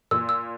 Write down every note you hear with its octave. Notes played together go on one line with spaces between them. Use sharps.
A#2 E6
E6